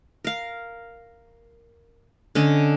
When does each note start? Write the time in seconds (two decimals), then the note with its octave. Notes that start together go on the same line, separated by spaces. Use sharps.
0.25 A#4 F5
2.35 D3 C#4 D#5